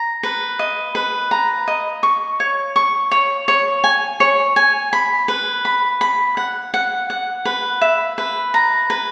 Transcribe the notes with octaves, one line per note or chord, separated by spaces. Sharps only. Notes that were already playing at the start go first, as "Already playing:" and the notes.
Already playing: A#5
B4
D#5
B4
A#5
D#5
C#6
C#5
C#6
C#5
C#5
G#5
C#5
G#5
B5
B4
B5
B5
F#5
F#5
F#5
B4
E5
B4
A#5
B4